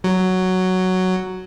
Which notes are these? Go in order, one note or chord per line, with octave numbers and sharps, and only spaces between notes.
F#3